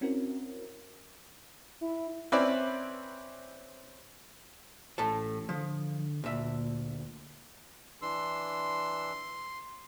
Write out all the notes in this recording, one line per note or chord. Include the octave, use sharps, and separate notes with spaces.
C4 C#4 E4 F#4 A#4
E4
C4 C#4 E4 B4 D5
A1 A2 A4 A5
D3 F3
D2 A#2 E5
E3 D4 C6 E6